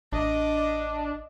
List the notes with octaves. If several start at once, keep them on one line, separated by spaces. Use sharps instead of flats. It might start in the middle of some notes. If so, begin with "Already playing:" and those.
A1 D4 D#5 D6